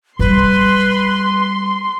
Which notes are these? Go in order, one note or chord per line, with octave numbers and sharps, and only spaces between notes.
G3 B4 C6